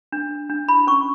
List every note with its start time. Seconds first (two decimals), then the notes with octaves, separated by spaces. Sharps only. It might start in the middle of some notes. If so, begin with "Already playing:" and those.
0.12 D4
0.31 D4
0.50 D4
0.69 E4 B5
0.87 C#4 C#6